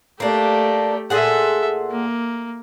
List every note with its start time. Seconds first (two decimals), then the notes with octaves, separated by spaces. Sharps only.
0.20 A3 A#3 D4 G4
1.10 A#2 G#4 A4 E5 F#5
1.90 A#3